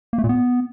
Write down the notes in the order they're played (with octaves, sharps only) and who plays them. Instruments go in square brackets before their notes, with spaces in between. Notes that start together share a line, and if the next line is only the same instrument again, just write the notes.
[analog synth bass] A#3
A3
A#2
B3